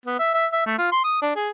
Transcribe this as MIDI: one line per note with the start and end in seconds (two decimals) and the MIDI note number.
0.06 0.19 59
0.20 0.30 76
0.34 0.46 76
0.53 0.64 76
0.67 0.79 57
0.79 0.90 65
0.92 1.02 84
1.04 1.19 87
1.22 1.31 62
1.36 1.50 68